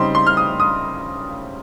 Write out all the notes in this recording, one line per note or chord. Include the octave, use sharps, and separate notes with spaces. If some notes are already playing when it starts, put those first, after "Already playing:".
Already playing: C#3 G3 C4 D#4 C6
C6
F6
D#6
D#6